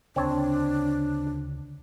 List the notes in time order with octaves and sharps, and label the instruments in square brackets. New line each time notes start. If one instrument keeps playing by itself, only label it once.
[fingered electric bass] D2 C#3 [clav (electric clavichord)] C4 C#5 A5 [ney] D4